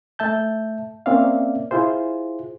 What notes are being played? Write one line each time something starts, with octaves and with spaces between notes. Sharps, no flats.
A3 E5 A5 G6
A#3 C4 C#4 D5 E5 F5
E4 F4 G#4 C5